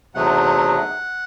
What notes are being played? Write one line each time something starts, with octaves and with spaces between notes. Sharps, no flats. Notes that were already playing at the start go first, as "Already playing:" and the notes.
E2 C3 F#3 A3 D#4 F#5